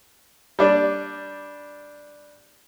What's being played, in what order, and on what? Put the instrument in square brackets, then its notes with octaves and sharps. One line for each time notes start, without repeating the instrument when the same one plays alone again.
[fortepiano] G3 D4